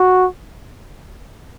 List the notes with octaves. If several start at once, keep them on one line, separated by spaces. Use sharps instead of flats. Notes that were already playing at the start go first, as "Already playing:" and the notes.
Already playing: F#4